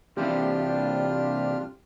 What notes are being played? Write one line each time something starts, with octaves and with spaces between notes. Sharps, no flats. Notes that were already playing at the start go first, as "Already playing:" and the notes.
C2 C3 E3 D4 F4 G4 F6